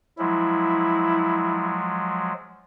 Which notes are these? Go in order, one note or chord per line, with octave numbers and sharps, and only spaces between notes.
F3 F#3 G#3 E4